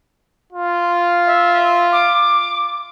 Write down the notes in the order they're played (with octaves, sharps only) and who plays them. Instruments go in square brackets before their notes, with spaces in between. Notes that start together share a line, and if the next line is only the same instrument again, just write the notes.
[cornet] F4
[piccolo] E5
D6